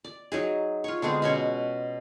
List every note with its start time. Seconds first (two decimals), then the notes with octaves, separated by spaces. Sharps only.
0.04 D5
0.32 F#3 D#4 G#4
0.84 F4 C#5
1.02 D3 G#3 B3 C4
1.22 B2 C#4 C#5